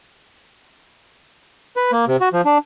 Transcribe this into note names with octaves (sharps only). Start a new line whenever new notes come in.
B4
A#3
C3
F#4
F3
D4